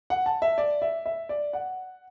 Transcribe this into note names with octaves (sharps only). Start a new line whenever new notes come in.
F#5
A5
E5
D5
E5
E5
D5
F#5